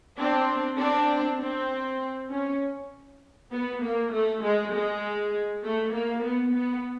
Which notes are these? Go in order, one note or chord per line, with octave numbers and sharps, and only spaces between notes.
C4 D4
C4 D4
C4
C#4
B3
A#3
A3
G#3
G#3
A3
A#3
B3
B3